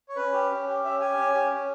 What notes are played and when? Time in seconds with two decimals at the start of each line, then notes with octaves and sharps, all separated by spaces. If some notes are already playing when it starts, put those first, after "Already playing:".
0.09 C#5
0.16 C#4 B4
0.33 G4
0.51 C#4
0.67 G4
0.84 C#4 E5
1.00 G4 G#5
1.17 C#4
1.34 G4
1.51 C#4